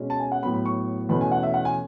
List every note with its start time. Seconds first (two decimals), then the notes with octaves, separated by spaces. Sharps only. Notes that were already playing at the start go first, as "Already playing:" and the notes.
Already playing: B2 G#3 C#4
0.10 A5
0.20 G#5
0.32 F#5
0.43 A2 F#3 B3 B5
0.54 B5
0.66 C#6
1.09 E2 B2 A3 C#4 B5
1.21 G#5
1.32 F#5
1.43 E5
1.54 F#5
1.65 G#5